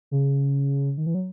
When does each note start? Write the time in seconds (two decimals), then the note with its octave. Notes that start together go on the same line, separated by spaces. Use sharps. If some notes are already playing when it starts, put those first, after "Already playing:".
0.11 C#3
0.97 D#3
1.06 E3
1.14 F#3